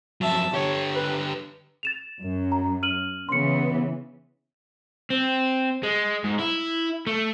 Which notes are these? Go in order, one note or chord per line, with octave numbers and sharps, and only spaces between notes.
F2 F#3 E5 A5
D3 G4 C#5
B4
A6 E7 F7
F#2
A#5
F6 D#7 F#7
C#3 E3 B3 C6 C#7
C4
G#3
G#2
E4
A3